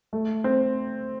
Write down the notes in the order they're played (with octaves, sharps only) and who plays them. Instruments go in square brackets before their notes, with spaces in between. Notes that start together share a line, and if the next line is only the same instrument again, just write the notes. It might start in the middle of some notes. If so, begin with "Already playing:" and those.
[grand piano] A3
C4